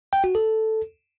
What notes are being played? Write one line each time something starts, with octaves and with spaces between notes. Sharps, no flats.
G5
F#4
A4